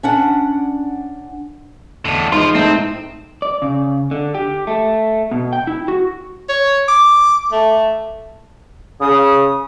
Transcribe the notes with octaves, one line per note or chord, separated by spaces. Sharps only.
C#4 D4 F#5
E2 A2 D3
G#2 F3 F4 C6
A2 A3 C4 D#4
D5
C#3
D3
G4
A3
B2
G5
E4
F#4
C#5
D6
A3
C#3 D#6